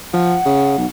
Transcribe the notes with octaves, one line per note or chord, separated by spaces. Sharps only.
F3 F#5
C#3
B1